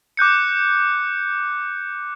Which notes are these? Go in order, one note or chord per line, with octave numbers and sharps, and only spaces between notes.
D6 F#6 G6 C#7